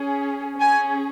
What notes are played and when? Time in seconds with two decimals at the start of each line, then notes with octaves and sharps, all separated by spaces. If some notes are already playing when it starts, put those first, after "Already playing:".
Already playing: C#4 G#4
0.60 C#4 G#4 G#5